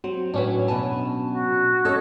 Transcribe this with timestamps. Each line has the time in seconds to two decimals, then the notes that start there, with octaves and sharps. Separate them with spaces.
0.04 F#3 C4
0.34 A2 F#3 C#4 D4 B4
0.68 B2 G#5 A5
1.30 F#4
1.85 C#4 A4 C#5 D#5